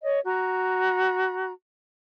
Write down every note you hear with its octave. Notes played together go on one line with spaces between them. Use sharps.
C#5 D#5
F#4 A#5